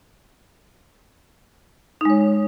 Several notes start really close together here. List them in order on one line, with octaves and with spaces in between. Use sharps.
D#4 G#3 C#5